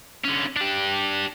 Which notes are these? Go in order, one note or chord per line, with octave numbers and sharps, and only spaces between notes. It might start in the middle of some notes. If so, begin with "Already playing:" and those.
D3 C#4
D4 G4